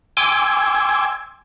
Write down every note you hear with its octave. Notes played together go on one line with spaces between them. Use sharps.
G5 G#5 C6 D6 E6 G#6